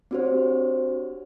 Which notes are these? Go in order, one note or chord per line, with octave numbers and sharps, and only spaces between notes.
C4 D4 F#4 G4 C5 C#5